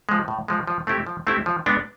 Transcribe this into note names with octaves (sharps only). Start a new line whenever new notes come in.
F3 G#3
A2
F3 G#3
F3
A3 C4 E4 G4
F3
A3 C4 E4 G4
F3
G#3 B3 D4